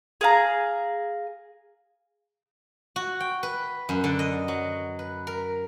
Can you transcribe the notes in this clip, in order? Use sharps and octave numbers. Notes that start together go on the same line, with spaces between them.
G#4 F5 A#5
F#4
G5
B4
F#2
D3
D#5
F#3
B4
A#4